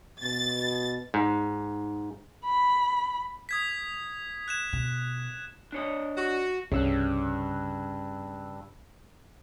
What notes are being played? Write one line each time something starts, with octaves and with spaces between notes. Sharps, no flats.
B2 A6
G#2
B5
D#6 G#6 B6
F#6 G#6 E7
B2
D4 C#5 D#5
F#4
C2 G2 C#3 E6 F#6